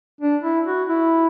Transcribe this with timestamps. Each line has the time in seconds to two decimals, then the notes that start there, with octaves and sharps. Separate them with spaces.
0.21 D4
0.44 E4
0.67 F#4
0.89 E4